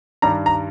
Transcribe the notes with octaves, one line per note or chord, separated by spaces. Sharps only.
G2 D#3 G3 A#5
A#5